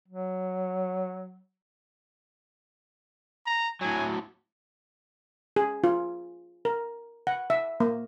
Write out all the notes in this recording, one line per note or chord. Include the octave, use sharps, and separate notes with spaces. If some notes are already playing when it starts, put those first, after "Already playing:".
F#3
A#5
A2 F#3 G#5
G#4
F4
A#4
F#5
E5
A#3